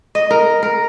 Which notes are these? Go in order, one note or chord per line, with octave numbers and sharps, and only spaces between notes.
D#5
A#4
A#4